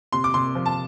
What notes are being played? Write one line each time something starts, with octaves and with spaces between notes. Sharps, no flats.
C3 C6
D6
C3 C6
F3
A5